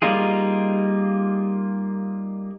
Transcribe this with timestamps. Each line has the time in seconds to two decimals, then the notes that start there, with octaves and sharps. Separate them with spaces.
0.02 G3 A#3 D#4 F4 G#4